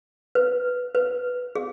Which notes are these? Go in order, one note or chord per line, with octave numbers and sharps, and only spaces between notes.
B4
B4
G#4